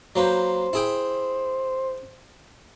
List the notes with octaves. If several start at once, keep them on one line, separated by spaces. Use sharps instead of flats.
F#3 A#3 B4 C5
E4 G#4 G5